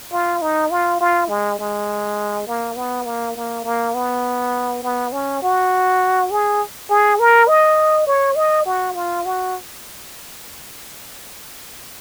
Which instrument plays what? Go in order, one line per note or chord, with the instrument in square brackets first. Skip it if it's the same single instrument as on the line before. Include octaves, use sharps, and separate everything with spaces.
[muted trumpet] F4
D#4
F4
F4
G#3
G#3
A#3
B3
A#3
A#3
A#3
B3
B3
C#4
F#4
G#4
G#4
A#4
D#5
C#5
D#5
F#4
F4
F#4